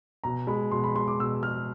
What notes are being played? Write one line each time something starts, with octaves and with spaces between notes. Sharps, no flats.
B2 A#5
G#3 B5
B2 C6
B5
G#3 C6
D6
B2 E6
G#3 F6